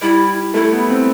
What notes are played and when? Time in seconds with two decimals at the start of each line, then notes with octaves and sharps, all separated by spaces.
0.02 G3 E4
0.54 A3 E4
0.72 B3
0.89 C4